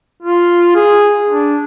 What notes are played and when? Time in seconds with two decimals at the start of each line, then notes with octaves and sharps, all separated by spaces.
0.23 F4
0.75 G#4
1.29 D4